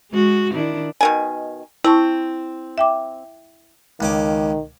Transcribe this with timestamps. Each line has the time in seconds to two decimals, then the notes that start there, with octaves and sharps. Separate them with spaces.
0.11 G#3 F#4
0.53 D#3 D4 E4
1.01 B2 D#3 G#5
1.84 C4 E4 A5 C#6
2.78 E5 G5 D6
4.00 C#2 D#3 C#4 D6